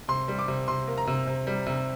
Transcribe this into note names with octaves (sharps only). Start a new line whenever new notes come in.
C3 C6
G3
D6
C3
C3 C6
A#3
A#5
C3
C3
G3
C3